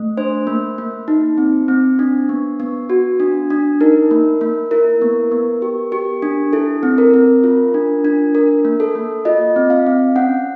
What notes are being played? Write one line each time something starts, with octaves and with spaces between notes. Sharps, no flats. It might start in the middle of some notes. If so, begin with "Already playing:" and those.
Already playing: A3
D4 C5
A#3
A#3
D#4
C4
C4
D4
B3
B3
F#4
D4
D4
D#4 A#4
A#3
A#3
E4 A#4
B3
B3
G4
G4
D4
E4 A4
C4
A#4
C4
F4
D4
D4
D4 A#4
A#3
A4
A#3
F4 D#5
C4
F5
C4
C#4 F#5